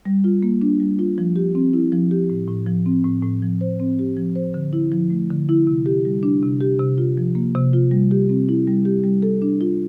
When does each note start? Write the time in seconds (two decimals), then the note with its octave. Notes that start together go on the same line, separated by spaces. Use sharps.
0.05 G3
0.24 F4
0.43 A#3
0.62 D4
0.80 G3
0.99 F4
1.18 F3
1.36 G4
1.55 C4
1.73 E4
1.93 F3
2.11 G4
2.30 A2
2.48 A2
2.67 F3
2.86 C4
3.04 A2
3.23 A2
3.42 F3
3.61 C5
3.80 C4
3.99 G4
4.17 F3
4.35 C5
4.54 D3
4.73 E4
4.92 F3
5.10 A3
5.30 D3
5.49 E4
5.67 C3
5.86 G4
6.05 G3
6.23 D4
6.43 C3
6.61 G4
6.79 C3
6.98 F4
7.17 F3
7.35 A#3
7.55 C3
7.73 F4
7.91 G3
8.11 G4
8.29 C4
8.49 E4
8.67 G3
8.85 G4
9.04 G3
9.22 A4
9.42 D4
9.61 F4